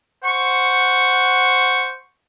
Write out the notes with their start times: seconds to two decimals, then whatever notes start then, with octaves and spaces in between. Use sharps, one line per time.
0.24 C5 F#5 C#6